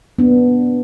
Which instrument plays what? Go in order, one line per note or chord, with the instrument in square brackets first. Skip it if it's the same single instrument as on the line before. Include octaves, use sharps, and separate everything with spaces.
[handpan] B3 D4